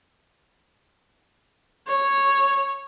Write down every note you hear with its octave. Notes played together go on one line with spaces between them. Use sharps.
C#5